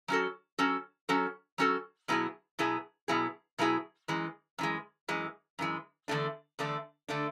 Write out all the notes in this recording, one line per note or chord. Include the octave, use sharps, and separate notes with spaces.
F#3 C#4 F#4 A4
F#3 C#4 F#4 A4
F#3 C#4 F#4 A4
F#3 C#4 F#4 A4
B2 F#3 B3 E4 G#4
B2 F#3 B3 E4 G#4
B2 F#3 B3 E4 G#4
B2 F#3 B3 E4 G#4
F#2 E3 G#3
F#2 E3 G#3
F#2 E3 G#3
F#2 E3 G#3
E2 D3 A3 D4
E2 D3 A3 D4
D3 A3 D4